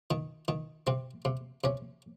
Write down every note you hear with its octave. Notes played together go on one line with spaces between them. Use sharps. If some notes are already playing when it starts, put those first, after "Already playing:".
D#3
D#3
C3 C4
C3
C3 C#4